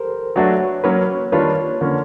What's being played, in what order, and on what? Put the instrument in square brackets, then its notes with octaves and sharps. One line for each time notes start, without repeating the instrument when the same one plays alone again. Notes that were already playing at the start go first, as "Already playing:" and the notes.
Already playing: [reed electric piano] G4 A4 A#4 C5
[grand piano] F#3 A3 D4 F#4 A4 [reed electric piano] B4 C#5
[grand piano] F#3 A#3 C#4 [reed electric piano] B4 C#5
[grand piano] D#3 G3 A#3 D4 F4 [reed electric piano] B4 C#5
[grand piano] D3 F3 A#3 C#4